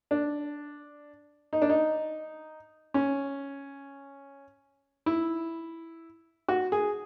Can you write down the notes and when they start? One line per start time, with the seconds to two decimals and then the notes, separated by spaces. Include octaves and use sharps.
0.11 D4
1.53 D#4
1.62 D4
1.70 D#4
2.94 C#4
5.06 E4
6.48 F#4
6.72 G#4